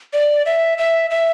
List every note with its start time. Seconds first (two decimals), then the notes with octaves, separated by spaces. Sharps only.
0.13 D5
0.46 E5
0.78 E5
1.10 E5